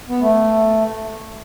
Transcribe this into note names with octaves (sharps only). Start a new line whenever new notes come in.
B3
A3